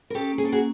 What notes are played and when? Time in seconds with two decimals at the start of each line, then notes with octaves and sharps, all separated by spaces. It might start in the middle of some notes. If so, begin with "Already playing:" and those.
0.10 A#4
0.15 C#4 G4 A4
0.32 A#3
0.38 G#4
0.45 A4
0.49 A#3 F#4 G#4